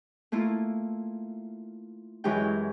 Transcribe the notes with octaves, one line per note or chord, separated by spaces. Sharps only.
A3 A#3 E4 F4
F#2 E3 F#3 G#3 G4 G5